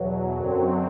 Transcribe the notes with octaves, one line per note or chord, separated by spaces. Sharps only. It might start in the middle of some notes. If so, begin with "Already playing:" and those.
Already playing: E2 B2 F#3
F#2 D3 F#3 C4